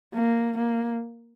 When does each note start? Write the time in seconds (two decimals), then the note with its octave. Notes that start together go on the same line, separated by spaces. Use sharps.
0.15 A#3
0.58 A#3